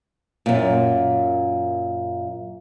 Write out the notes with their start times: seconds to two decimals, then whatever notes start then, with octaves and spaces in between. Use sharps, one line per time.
0.46 F#2 A#2